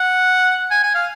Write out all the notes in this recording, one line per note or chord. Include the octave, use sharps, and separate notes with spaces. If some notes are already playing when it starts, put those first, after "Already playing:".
Already playing: F#5
G#5
G#5
F5